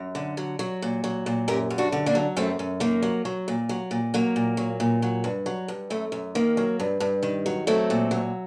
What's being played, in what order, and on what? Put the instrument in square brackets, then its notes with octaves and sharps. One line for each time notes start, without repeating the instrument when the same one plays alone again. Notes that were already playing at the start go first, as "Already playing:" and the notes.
Already playing: [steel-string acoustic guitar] F#2
D3
F#3
F#3
A#2
F#3
A#2
F#2 G4 A#4
F#2
D4 F#4
D3
A#3 D4
F#3
F#2 A3 C4
F#2
D#3 A#3
F#3
F#3
A#2
F#3
A#2
F#3 A#3
A#2
F#3
A#2
F#3
G2
F#3
G2
F#2 A3
F#2
D#3 A#3
F#3
G2
G2
D#3
F#3
F#3 A3 C4
A#2
F#3